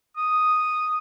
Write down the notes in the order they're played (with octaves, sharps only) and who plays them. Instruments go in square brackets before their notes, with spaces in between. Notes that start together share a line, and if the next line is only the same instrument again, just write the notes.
[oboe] D#6